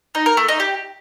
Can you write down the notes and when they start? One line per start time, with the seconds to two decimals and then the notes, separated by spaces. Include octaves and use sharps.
0.15 D#4
0.26 A#4
0.37 A3
0.48 D#4
0.60 G4